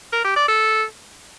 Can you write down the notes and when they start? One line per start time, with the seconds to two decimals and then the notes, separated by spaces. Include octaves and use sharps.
0.13 A#4
0.25 G4
0.36 D5
0.48 A4